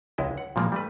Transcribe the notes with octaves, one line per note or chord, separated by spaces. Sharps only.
C#2 G#3 E4 D#5
F#5
A#2 E3 F3 G#3 A#3
G3 A3 B4